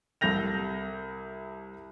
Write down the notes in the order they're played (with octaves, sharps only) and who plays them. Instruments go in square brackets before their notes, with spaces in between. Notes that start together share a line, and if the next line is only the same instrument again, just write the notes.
[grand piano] C2 A4 G6 A#6 F7